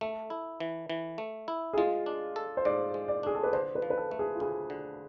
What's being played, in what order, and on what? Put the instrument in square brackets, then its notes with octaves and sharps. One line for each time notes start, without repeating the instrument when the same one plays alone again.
[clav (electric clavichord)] A3 [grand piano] A4
[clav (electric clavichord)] E4
E3
E3
A3
E4
[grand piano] G#4
[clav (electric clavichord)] G#3 [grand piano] F4
[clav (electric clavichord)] D4
A4
[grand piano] C5
[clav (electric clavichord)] G#2 [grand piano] D5
[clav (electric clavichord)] G#3
[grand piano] D5
[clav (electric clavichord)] D4 [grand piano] G#4
[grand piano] A4
B4
[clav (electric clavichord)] D3 [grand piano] C5
[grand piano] B4
[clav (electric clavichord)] F3
[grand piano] B4
A4
[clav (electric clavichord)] A3 [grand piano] A4
[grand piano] G#4
F4
[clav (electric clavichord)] D2 [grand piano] G#4
[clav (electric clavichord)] D3